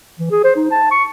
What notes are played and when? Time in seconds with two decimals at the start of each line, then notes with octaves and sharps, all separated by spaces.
0.19 E3
0.31 G#4
0.44 C5
0.56 D#4
0.71 A5
0.91 C#6